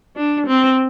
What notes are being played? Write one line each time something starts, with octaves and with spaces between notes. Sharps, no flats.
D4
C4